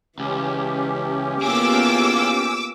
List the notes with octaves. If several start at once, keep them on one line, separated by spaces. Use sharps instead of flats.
C#2 E3 C#4 G4
A#3 B3 E4 F4 G#4 D6 E6